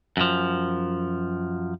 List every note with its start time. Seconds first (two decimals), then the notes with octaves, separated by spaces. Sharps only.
0.17 F#2 F3